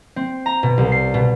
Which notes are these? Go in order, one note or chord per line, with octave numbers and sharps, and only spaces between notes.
C4
A#5
B2
C2
C7
B2